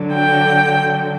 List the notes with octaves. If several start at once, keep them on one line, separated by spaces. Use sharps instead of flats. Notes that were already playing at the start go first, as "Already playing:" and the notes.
Already playing: D3 F#3
G5